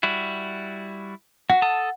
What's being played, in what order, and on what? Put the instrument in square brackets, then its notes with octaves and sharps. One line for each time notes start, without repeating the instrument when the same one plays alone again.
[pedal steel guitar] G3 E4 F#4
[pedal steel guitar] F#4 [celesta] F#5
[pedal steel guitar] A4 A5 D#6